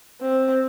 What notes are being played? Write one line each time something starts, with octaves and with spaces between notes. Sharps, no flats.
C4